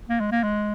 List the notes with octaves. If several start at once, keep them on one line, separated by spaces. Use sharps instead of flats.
A#3
G#3
A#3
G#3